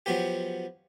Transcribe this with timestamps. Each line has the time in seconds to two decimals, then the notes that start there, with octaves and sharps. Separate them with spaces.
0.06 F3 F#3 B3 G4